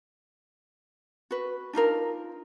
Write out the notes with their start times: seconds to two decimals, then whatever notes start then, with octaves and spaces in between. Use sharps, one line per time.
1.31 F#4 B4
1.73 D4 D#4 F4 A#4